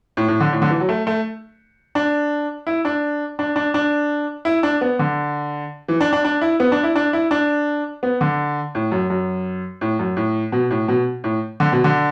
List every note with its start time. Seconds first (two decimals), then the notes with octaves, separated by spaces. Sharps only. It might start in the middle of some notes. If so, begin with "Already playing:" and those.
0.17 A2
0.28 A2
0.40 D3
0.53 A2
0.62 D3
0.70 E3
0.80 F#3
0.89 A3
1.07 A3
1.95 D4
2.67 E4
2.85 D4
3.39 D4
3.56 D4
3.74 D4
4.45 E4
4.63 D4
4.81 B3
4.99 D3
5.88 E3
6.01 D4
6.13 D4
6.24 D4
6.42 E4
6.60 B3
6.72 D4
6.84 E4
6.96 D4
7.13 E4
7.31 D4
8.03 B3
8.21 D3
8.75 A2
8.92 F#2
9.10 F#2
9.81 A2
9.99 F#2
10.17 A2
10.52 B2
10.71 A2
10.88 B2
11.24 A2
11.60 D3
11.72 B2
11.84 D3